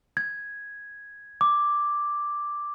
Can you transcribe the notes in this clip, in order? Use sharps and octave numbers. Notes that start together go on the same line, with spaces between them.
G#6
D6